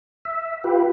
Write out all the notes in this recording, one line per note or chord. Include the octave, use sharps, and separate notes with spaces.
E5
F4 G4 B4